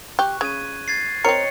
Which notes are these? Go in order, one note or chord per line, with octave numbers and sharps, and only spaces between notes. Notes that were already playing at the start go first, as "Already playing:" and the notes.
G4 C#6 F#6
C#3 B5 G#6 D#7
G#6 A6 C7
C4 A#4 C#5 D#5 G5 C#7